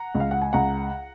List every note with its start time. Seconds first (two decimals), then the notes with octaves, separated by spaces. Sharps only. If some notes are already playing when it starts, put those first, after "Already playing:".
Already playing: F#5 A#5
0.15 C#2
0.20 F5
0.31 F#5
0.42 G#5
0.53 C#2 F#5 A#5